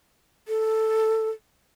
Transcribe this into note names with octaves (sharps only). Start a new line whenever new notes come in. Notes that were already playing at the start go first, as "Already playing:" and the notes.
A4